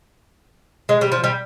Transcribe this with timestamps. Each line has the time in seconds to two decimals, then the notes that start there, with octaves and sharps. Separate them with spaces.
0.89 G#3
1.01 G3
1.12 F3
1.24 G3